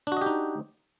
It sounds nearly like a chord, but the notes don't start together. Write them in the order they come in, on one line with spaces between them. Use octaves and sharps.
D4 F#4 D#5 G4 D#4